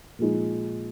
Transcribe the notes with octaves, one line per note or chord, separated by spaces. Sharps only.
A#2 F3 G#3 D#4